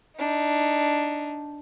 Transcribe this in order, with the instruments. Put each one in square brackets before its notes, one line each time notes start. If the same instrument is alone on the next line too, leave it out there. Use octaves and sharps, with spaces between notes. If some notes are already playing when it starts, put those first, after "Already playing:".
[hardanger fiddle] D4 D#4